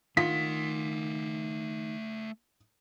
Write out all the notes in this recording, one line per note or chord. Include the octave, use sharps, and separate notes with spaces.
D#3 A3 F4 F#5 B6